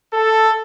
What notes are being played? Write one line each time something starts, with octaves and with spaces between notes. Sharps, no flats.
A4